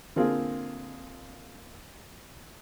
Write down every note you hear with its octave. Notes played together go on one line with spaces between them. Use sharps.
D3 A#3 C4 F4 G#4